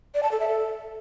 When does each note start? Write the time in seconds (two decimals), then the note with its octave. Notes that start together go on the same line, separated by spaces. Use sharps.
0.14 D5
0.23 A5
0.31 A4
0.40 E5
0.48 A4